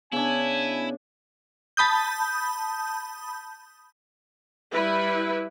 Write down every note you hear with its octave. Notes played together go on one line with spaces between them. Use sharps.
C#3 B3 D4 E4 G#5
A5 B5 D#6 G6
G3 E4 B4